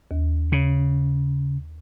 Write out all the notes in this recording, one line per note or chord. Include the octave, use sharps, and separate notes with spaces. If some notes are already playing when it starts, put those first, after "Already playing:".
D#2
C#3